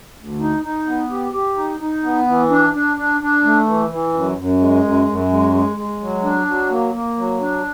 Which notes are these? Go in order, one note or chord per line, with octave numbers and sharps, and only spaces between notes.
D2
D#4
D#4
B3
G4
G4
D#4
D#4
B3
E3
D4
D4
D4
D4
A3
E3
E3
F#2
F#2
G#3
F#2
F#2
G#3
G#3
G#3
F#3
D4
F#3
A#3
A#3
F#3
D4